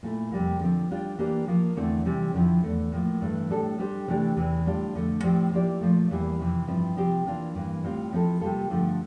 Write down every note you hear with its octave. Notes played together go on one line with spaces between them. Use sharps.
A#2 A3 E4
F2 C3 G3 A#3
D3 F3 C4
G3 D4 F4
E3 A#3 D4 G4 D5
F3 A#3 F4 A#4
E2 D3 A3 C4 E4
C3 E3 G3 C4
F2 D3 F3 C4 E4
E2 D3 A3
A2 F3 A#3
G2 E3 A3
A2 G3 D4 A4
G3 D4 G4 C5
C3 E3 A3 D4 G4
E2 C3 E3
A2 G3 D4 F4
F2 D3 A3
A2 F3 C4 G4 D5
F3 A#3 E4 G4 D5
A#2 F3 A3
E2 E3 G3 A#3 E4
F2 C3 E3
G2 F3 C4 E4
C3 F3 C4 G4
E3 A#3 D4 F4
G2 E3 A#3
A2 G3 C4 F4
F3 C4 E4 A4
C3 G3 A#3 F4 A4
G2 D3 F3 A3